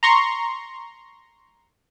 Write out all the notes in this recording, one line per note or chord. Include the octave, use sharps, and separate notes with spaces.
A#5 C6 C#6